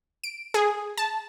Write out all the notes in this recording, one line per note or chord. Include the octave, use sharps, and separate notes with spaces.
D7
G#4
A5